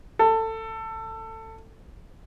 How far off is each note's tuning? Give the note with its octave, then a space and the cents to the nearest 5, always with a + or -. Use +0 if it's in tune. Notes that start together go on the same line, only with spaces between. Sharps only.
A4 +20